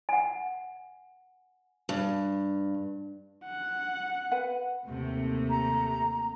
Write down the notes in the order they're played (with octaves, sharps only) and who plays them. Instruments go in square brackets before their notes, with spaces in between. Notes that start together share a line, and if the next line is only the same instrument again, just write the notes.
[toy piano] F#5 G#5
[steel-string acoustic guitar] G2
[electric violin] F#5
[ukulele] B4 F#5
[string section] D#2 C3 A3
[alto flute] A#5